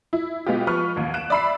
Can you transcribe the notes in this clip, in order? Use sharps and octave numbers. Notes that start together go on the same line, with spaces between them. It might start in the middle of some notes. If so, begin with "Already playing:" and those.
E4
B2 G#3 B3 F4 G4
F3 B4 C#6 F6
A1 D#2
F#6 D7 E7
D5 E5 B5 E6 C7